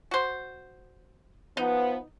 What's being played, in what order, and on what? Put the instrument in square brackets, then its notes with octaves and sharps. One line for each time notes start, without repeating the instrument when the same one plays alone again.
[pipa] F#4 C5
[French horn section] F3 B3 [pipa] D#4